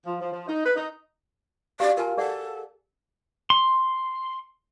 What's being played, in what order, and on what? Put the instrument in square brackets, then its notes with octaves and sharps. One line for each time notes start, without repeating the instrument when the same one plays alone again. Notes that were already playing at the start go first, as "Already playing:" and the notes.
[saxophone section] F3
F3
F3
D#4
B4
D#4
[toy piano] F#4 G4 F5 [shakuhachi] D5
[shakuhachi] F4 [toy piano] A#4 G#5 A5
[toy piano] G#4 D5 F#5 [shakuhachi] A4
[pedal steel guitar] C6